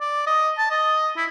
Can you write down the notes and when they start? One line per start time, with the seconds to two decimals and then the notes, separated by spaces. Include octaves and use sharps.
0.01 D5
0.27 D#5
0.58 A5
0.71 D#5
1.17 E4